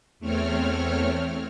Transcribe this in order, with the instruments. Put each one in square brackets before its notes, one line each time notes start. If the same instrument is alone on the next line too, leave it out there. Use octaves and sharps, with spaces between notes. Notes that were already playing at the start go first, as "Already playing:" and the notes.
[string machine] E2 A3 C4 C#5 F6